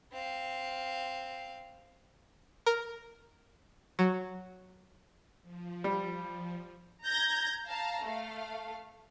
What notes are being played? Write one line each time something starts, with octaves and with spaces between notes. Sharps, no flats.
C4 F5
A#4
F#3
F3
G3
A#5 G6 G#6 A#6
F5 A5 A#5
A3 F5